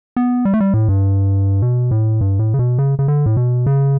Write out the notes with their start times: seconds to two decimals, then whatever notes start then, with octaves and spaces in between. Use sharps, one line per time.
0.16 B3
0.45 G3
0.54 A3
0.60 G3
0.74 A2
0.89 G2
1.62 B2
1.91 A2
2.21 G2
2.39 A2
2.54 C#3
2.59 B2
2.79 C#3
2.99 C#3
3.08 D3
3.26 A2
3.37 B2
3.66 C#3